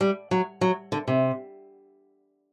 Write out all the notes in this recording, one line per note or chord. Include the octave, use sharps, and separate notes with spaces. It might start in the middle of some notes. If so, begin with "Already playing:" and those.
G3
F#3
F#3
D3
C3